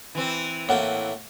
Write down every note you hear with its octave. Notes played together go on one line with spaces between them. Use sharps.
E3 C4
A2 A#3 F#5 G5